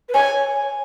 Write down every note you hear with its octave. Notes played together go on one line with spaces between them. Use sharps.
B4
C#5 G#5